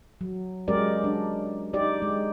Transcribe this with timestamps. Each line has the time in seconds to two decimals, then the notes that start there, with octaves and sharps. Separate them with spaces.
0.21 F#3
0.68 F#3 G#3 C#4 G4 A#4 D5
1.04 D4
1.73 D#4 G4 D5
2.02 G#3